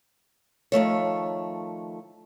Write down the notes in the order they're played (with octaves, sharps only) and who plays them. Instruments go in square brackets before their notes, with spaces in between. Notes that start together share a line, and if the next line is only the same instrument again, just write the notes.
[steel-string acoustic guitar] D#3 F3 A3 C#5